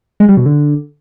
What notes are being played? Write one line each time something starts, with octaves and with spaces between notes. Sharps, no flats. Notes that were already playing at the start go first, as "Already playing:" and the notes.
G#3
G3
B2
D3